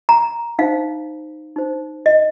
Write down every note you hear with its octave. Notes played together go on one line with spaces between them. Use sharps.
A#5
D#4 C5 F5
D#4 C5
D#5